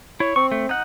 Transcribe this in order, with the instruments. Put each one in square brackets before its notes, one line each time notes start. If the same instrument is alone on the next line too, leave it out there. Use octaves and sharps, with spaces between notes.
[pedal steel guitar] E4 [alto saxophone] C#5
[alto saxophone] C4 [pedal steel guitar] C#6
[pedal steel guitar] A3
D#4 F#5